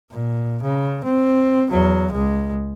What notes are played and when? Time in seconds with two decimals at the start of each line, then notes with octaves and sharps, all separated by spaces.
0.11 A#2
0.62 C#3
1.04 C4
1.70 E2 F#3
2.12 C#2 G#3